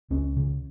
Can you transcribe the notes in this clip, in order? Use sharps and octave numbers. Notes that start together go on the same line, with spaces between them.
C#2 C#4
C#3